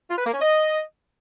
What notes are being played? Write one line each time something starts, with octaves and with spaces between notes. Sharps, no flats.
F4
B4
A#3
C#4
D#5